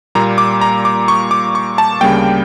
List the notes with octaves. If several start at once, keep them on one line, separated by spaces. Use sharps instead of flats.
A#2 G3 A#3 A#5
D6
A#5
D6
C#6
D6
C#6
A5
D2 C#3 G3 A#3 G5